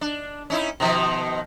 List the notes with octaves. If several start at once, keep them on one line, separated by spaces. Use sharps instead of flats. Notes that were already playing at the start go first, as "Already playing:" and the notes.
D4
C#4 D#4 E4
B2 D#3 F3